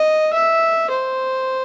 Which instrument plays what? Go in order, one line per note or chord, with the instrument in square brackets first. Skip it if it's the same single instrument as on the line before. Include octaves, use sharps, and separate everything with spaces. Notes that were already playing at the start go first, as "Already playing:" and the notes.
Already playing: [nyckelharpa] D#5
E5
C5